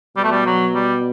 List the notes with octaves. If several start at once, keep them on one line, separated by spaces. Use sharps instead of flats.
B2 G3
A3
G3
F#3
G3